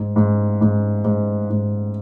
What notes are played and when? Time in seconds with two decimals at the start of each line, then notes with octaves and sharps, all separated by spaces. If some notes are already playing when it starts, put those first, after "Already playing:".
Already playing: G#2
0.16 G#2
0.61 G#2
1.04 G#2
1.50 G#2